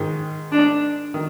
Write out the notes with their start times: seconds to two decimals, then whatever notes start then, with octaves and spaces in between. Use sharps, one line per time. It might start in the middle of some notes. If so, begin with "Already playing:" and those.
Already playing: G#2 D#3 G#3
0.52 D4
1.14 D#3